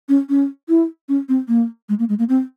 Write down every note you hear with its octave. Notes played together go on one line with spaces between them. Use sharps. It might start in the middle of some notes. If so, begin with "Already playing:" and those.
C#4
C#4
E4
C#4
C4
A#3
G#3
A#3
G#3
A#3
C4